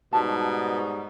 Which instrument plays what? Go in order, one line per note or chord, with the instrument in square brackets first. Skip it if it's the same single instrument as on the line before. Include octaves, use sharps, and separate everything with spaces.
[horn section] G#2 G3 D#4 [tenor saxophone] B2 [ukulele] A5